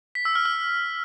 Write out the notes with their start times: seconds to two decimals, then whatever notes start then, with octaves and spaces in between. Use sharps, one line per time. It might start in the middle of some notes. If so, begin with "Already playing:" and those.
0.15 B6
0.25 E6
0.35 F6
0.46 F6